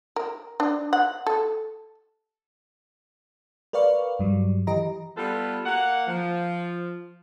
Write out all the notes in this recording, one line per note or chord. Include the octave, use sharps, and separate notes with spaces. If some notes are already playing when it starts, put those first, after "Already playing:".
A#4
D4
F#5
A4
A#4 B4 D5 F5 C#6
G2 F#3 G3
E3 G4 D#5 A#5
G3 B3 F4 A4 B4
A#3 F#5
F3